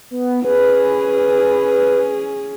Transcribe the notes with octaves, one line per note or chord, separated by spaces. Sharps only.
B3
C#4 G#4 B4